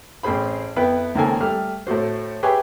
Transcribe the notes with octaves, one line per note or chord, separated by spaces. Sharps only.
A1 C4 G#4 C5 B5
F2 B3 E4 B4 G5
C#2 D#3 A#3 C4 A4 G#5
G3 A3 F6
A2 A3 F#4 C5
G4 G#4 B4 C#5 E5 G#5